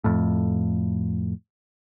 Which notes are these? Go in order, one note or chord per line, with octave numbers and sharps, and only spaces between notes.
F2 A2